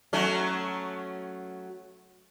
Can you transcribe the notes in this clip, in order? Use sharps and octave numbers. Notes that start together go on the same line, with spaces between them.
F#3 A3 C#4